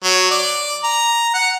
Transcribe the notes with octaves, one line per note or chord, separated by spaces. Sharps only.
F#3
D5
A#5
F#5